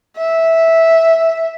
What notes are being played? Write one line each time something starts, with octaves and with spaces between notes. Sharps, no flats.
E5